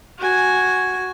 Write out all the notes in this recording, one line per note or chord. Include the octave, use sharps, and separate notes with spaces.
F#4 G#5